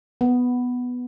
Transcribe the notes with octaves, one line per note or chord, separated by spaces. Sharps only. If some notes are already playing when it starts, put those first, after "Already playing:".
B3